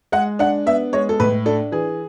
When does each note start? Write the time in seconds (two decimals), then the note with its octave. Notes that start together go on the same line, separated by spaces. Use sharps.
0.12 G#3 F#5
0.39 D4 F#5
0.66 B3 E5
0.93 G#3 C#5
1.09 A4
1.20 A2 B4
1.46 D4 A4
1.72 E3 G#4